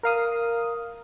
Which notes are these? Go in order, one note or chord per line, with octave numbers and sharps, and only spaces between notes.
A#4 F5 D#6